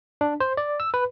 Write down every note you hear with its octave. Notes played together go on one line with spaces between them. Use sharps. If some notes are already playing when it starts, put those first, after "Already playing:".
D4
C5
D5
E6
B4